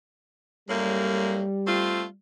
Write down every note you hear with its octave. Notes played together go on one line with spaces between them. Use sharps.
F#2 A2 G3 A#3
A3 C4 F4